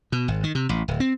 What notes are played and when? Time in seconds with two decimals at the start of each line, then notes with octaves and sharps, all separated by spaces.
0.12 B2
0.28 G#1
0.44 D#3
0.55 C3
0.69 A1
0.88 D1
1.00 C4